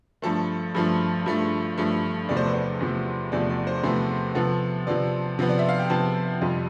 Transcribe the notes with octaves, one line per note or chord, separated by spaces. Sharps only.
G2 F3 A3 A4
G2 F3 A3
G2 F3 A3
G2 F3 A3
E2 C3 F3 A3 D5
C5
B4
C5
E2 C3 F3 A3
E2 C3 F3 A3 D5
D5
C5
E2 C3 F3 A3 B4
C3 F3 B3 A4
C3 F3 B3 D5
C3 F3 B3
D5
E5
F5
G5
C3 F3 B3 A5
F2 C3 G3